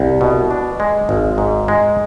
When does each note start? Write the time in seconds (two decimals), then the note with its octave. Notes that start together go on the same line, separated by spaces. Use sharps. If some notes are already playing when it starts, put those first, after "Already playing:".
Already playing: C2
0.21 B2
0.50 D4
0.80 G#3
1.09 G#1
1.38 G#2
1.68 G#3